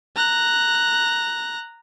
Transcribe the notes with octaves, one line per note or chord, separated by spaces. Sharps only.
A#5 F#6